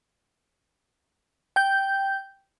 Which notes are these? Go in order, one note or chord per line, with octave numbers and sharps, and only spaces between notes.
G5 G6